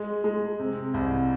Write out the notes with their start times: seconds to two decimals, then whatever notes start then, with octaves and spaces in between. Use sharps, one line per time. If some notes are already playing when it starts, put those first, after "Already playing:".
Already playing: G#3
0.24 G#3
0.59 C3
0.94 C2